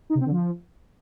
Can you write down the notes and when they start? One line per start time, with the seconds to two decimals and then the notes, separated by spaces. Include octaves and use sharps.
0.10 D#4
0.15 C3
0.20 C4
0.26 D3
0.31 F3